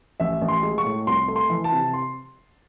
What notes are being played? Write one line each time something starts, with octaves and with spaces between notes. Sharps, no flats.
A1 E5
A1
C6
G#3
C#6
A2
C2 C6
A3
C6
E3
A5
C3
C6